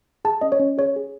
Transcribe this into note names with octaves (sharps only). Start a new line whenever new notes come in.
G#4 A5
C#4 D#5
C#5
C#4
G#4 C#5
G#4